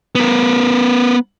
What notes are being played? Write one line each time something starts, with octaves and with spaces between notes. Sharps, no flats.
B3 A#4